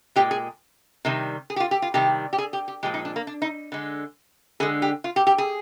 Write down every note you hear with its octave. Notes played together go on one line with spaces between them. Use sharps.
A#2 G#3 G4
G#4
C3 D#3 G3
G#4
G4
F4
G4
F4
C3 D#3 G3 G4
G4
G#4
G4
G4
A#2 F3 G#3 G4
D#4
D4
A#3
D4
D#4
D3 G#3
D3 G#3 G#4
G4
F4
G4
G4
G#4